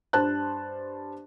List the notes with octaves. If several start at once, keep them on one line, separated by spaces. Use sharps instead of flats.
G2 C5 A5 F#6